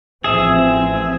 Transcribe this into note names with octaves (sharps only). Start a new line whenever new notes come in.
A1 F3 C4 G#4 E5